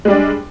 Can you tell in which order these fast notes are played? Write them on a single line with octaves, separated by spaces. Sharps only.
G#3 G3 D4